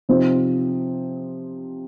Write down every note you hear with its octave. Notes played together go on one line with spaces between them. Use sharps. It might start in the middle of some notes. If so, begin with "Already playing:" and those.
C3 F3 C4 D#4